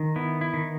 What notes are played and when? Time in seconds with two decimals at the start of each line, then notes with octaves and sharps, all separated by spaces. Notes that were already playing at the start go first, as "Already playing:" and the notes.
Already playing: D#3
0.16 B3 E4
0.41 E4
0.54 D#3